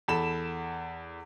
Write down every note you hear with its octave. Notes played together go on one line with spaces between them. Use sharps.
E2 A4 B5 E7